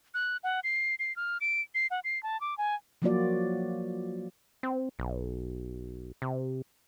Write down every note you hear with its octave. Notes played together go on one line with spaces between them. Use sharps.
F#6
F#5
C7
C7
F6
D7
C7
F#5
C7
A5
D6
G#5
F3 F#3 A#3 F4 F#4 D5
C4
B1
C3